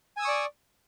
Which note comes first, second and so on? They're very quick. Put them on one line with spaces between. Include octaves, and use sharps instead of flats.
G#5 E6 D#6 C#6 D5